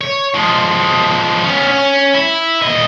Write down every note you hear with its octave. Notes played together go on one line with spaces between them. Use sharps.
C#5
F3 G#3
B3 C#4
C#4
E4
A#2 D#5